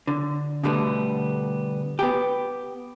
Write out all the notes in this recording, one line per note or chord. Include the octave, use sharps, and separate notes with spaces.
D3
B2 D3 G3 A3 B3
B3 G4